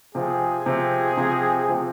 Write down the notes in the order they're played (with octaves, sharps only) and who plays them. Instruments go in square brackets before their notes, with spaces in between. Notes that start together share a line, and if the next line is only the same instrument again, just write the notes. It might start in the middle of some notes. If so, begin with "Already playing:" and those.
[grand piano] C3 F3 C4 [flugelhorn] G#4
[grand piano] C3 F3 C4
C3 F3 C4
C3 F3 C4